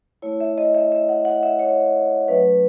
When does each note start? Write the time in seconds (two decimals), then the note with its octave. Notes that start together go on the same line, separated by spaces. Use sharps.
0.22 A3 E4 C#5
0.40 E5
0.58 D#5
0.75 E5
0.92 E5
1.09 F#5
1.25 F#5
1.43 E5
1.59 C#5
2.28 F#3 A3 C#4 B4